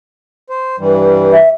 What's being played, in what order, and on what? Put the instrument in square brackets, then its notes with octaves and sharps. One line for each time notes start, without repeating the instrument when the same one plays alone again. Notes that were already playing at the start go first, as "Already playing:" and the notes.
[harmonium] C5
G2 E3 G3
[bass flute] E5